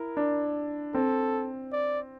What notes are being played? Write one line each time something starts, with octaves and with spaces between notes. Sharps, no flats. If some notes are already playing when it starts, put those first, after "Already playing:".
Already playing: E4 A#4
D4
C4 A4
D5